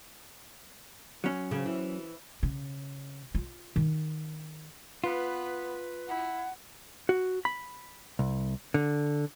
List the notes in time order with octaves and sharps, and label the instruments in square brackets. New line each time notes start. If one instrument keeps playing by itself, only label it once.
[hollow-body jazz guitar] F#3 C#4
[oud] C#3
E3
[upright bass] C#3
F4
D#3
[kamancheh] B3 [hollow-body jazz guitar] F4 [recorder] B4
[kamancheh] E4 [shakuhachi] F#5
[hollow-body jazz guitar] F#4
B5
C2
D3